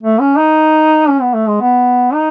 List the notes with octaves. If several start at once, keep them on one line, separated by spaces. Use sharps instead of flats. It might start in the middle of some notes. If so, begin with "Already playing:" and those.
A3
C#4
D#4
C#4
B3
A3
G#3
B3
D#4